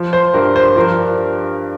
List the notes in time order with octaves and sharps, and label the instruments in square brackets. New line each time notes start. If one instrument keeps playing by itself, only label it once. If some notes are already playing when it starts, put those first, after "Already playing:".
Already playing: [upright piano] F3
C5
G2 A#4
C5
F3 A#4